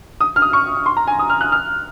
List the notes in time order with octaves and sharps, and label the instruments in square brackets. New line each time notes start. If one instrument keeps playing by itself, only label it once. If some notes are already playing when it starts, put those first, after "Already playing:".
[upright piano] D#6
F6
D#6
C#6
C6
A#5
G#5
D#6
F6
F#6
F6